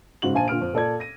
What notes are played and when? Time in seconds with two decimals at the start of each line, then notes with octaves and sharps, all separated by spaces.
0.22 G#2 C#3 F#4 F#7
0.34 A#1 C5 F5 G#5 A5 D#7
0.48 A#2 D3 F6 D7
0.61 F2
0.73 A#2 A4 D5 G#6
1.00 A#6 D#7